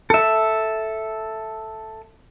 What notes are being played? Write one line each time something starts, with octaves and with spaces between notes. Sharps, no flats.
A4 E5